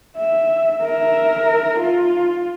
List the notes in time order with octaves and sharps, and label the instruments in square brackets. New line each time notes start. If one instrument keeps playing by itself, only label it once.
[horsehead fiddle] E5
A#4 E5
F4